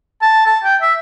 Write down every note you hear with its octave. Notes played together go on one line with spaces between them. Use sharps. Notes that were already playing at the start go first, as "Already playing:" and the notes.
A5
A5
G5
E5